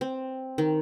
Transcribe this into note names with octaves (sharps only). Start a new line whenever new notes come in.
C4
D#3